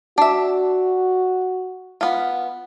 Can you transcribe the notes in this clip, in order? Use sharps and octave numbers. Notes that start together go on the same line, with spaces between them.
D4 F#4 E5
B3 F4